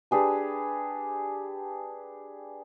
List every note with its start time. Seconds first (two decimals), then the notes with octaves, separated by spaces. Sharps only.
0.11 D4 G4 G#4 B4